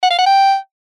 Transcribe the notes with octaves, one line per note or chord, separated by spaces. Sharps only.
F#5
F5
F#5
G5